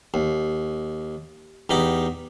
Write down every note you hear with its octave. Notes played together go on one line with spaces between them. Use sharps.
D#2
E2 D#4 G4 B5